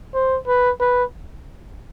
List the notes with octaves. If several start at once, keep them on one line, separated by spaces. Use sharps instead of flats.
C5
B4
B4